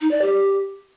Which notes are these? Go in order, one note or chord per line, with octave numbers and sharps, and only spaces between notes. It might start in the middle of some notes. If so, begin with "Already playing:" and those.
D#4
D5
G4